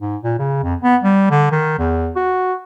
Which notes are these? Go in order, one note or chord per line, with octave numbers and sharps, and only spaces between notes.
G#2
A#2
C#3
F2
B3
G3
D3
D#3
E2
F#4